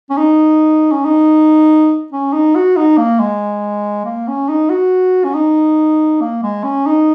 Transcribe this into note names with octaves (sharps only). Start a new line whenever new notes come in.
C#4
D#4
C#4
D#4
C#4
D#4
F#4
D#4
A#3
G#3
A#3
C#4
D#4
F#4
C#4
D#4
A#3
G#3
C#4
D#4